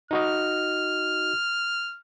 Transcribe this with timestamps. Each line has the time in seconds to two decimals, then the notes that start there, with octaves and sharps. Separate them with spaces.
0.11 D#4 F#4 D#5 F6